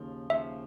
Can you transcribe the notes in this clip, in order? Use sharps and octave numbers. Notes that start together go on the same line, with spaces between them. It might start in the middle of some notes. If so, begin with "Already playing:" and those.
Already playing: D#2 C#3 F3
D#2 C#3 F3 E5